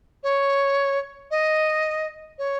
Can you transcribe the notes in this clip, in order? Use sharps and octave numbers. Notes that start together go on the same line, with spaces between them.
C#5
D#5
C#5